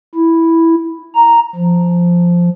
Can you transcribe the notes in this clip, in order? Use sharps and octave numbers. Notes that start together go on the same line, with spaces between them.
E4
A#5
F3